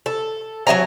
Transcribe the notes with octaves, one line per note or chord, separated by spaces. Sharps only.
A4
F#3 E4 G#5 A#5